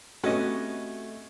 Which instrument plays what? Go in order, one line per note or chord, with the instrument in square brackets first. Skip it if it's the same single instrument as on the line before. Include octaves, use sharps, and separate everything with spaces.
[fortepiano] C3 B3 C#4 [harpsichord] A3 [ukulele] F#4 D#5